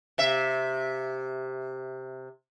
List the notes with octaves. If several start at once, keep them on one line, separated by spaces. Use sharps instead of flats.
C3 E5